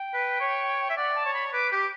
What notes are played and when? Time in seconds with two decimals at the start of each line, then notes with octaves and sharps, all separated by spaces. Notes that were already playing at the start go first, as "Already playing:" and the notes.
Already playing: G5
0.14 B4
0.40 C#5
0.90 E5
0.97 D5 F#5
1.15 A5
1.25 C#5
1.34 B5
1.47 C#6
1.53 B4 D6
1.72 G4 D6